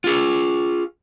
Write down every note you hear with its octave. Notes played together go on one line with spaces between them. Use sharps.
F4 G#4